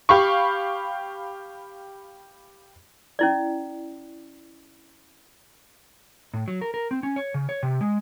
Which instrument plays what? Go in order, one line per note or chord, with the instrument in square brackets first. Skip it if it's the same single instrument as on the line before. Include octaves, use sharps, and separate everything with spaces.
[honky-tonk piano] G4 F5 B5 C#6
[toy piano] C#4 E4 D5
[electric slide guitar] A2
F#3
A#4
A#4
C4
C#4
C#5
C#3
C#5
C3
G#3